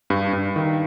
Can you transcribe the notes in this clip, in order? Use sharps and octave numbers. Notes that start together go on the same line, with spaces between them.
G2
G2
D#3